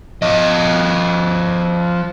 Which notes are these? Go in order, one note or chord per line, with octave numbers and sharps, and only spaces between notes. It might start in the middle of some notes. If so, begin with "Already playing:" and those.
F3 D#5